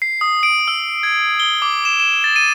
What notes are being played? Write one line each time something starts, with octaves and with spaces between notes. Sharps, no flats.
C7
D#6
D7
E6
G#6
G7
D6
E7
E7
A6
D#7